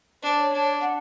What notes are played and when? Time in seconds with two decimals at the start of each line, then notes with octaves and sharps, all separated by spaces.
0.22 D4 C5
0.37 C#5
0.52 D4
0.80 F#5